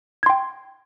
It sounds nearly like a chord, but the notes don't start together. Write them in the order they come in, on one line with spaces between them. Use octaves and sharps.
G#6 C6 G5